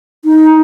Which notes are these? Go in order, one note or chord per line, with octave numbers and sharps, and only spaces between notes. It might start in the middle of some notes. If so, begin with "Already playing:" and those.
D#4